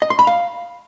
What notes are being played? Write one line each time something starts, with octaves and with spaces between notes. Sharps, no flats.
D#5
C6
B5
F5